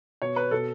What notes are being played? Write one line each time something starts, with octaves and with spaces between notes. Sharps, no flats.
B2 C#5
B4
B2 A4